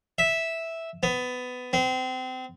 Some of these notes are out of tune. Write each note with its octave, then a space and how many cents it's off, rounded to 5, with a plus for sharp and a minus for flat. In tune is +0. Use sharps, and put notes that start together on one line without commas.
E5 -5
B3 +20
C4 -30